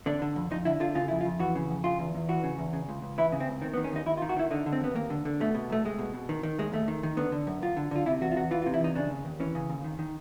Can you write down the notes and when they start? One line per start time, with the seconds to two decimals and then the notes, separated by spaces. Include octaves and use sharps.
0.06 D3 D4
0.22 D3
0.36 F2
0.51 F2 D#4
0.65 D3 E4
0.80 D3 F4
0.95 C#3 F4
1.08 F2 E4
1.21 F4
1.25 F2
1.40 E3 F#4
1.55 C#3
1.70 F2
1.84 C#3 F4
1.99 E2
2.15 E2
2.29 E3 F#4
2.43 C#3
2.58 E2
2.73 C#3
2.89 C#2
3.02 C#2
3.18 E3 E4
3.32 C#3
3.40 C4
3.48 C#2
3.62 D#3 C4
3.73 B3
3.77 D#3
3.84 C#4
3.92 D#2 D#4
4.06 D#2 E4
4.17 F4
4.22 D#3
4.29 F#4
4.37 D#3 E4
4.51 D3 D#4
4.66 D3
4.73 C4
4.81 D#2 B3
4.95 D#2 A#3
5.10 D3
5.25 D3
5.40 B2 A3
5.55 B2
5.70 C2 A3
5.85 C2 G#3
5.99 B2
6.14 B2
6.29 D#3
6.43 D#3
6.58 D#2 G#3
6.73 D#2 A3
6.88 D#3
7.03 D#3
7.17 D3 B3
7.32 D3
7.47 F#2
7.62 F#2 F4
7.77 D3
7.91 D3 F4
8.06 C3 E4
8.21 E2 F#4
8.32 F4
8.36 E2 F#4
8.51 E3 F4
8.62 F4
8.66 C3
8.74 E4
8.80 E2 D#4
8.95 C#3 D4
9.10 D#2
9.25 D#2
9.40 E3 C#4
9.55 C#3
9.69 D#2
9.84 D#3
9.99 D#3